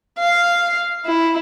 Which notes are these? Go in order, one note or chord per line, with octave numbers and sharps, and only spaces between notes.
F5
E4